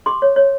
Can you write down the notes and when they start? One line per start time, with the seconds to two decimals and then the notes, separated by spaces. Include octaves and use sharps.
0.06 G4 C6 D6
0.22 C#5
0.36 C#5